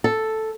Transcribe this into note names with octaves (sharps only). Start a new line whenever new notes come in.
A4